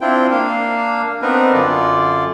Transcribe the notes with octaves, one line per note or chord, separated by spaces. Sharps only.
C4 D4 E4 F4 G5
A#3 D4 F5
B3 C4 D4 D#4 A#4 B4
F#2 D3 F4 D5